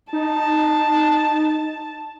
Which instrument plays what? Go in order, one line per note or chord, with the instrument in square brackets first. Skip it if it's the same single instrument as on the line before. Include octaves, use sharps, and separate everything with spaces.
[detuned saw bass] D#4 [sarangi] A5